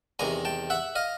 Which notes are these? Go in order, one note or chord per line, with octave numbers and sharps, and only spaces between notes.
E2 C3 D#3 G#5 A#5
G5 A5
E5 F#5
D#5 F5